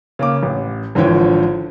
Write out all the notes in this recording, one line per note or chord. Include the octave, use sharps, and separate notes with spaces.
C#3 A#3 D6
A1
G#1 D3 E3 F3 C#5 G5